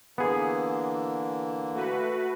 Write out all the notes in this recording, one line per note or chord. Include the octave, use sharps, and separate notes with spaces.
D3 E3 A#3 B3 G#4
A3 F#4 B4